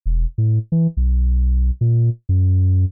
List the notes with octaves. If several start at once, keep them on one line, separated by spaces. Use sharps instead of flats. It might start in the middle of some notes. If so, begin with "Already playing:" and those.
E1
A2
E3
B1
A#2
F#2